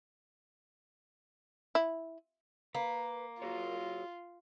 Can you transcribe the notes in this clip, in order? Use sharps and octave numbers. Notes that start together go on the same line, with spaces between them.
E4
A#3 B4
F4 F#4 G#4 C#5